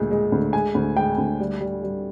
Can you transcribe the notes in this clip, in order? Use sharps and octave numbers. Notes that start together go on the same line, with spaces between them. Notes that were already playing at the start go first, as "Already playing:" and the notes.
Already playing: D2 A#2 G#3
G#3
D2
G#3 G#5
D2
G#3 G5
D2
G3
G3
G3